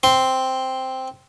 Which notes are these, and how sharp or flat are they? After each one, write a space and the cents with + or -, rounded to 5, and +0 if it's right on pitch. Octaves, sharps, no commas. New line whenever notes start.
C4 +0 C6 +0